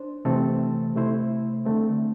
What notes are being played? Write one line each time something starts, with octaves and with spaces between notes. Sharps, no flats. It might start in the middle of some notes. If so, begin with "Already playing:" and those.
Already playing: D4 C5
C3 E3 A3 C4 A4
C3 A3 E4 C5
D3 A3 C4